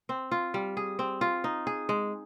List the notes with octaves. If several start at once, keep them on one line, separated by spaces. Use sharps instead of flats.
C4
F4
G3
G#4
C4
F4
D#4
G#4
G#3